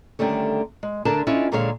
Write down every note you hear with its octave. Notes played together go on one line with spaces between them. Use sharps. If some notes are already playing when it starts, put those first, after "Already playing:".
D3 D#3 G3 A3 C#4
G#3
D2 D3 D4 A#4 A5
C#4 D4 E4 F4 D#5
A#2 D3 D#3 G#3 C#5 F5